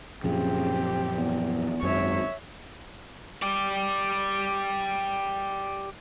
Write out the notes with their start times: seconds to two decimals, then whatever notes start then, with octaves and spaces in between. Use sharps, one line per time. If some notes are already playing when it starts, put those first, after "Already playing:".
0.24 F#2 A#2 C#3 F3 C4 G4
1.17 E2
1.83 G#1 F#2 C#5 E5
3.42 G4 D5